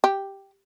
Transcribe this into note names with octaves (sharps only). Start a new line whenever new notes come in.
G4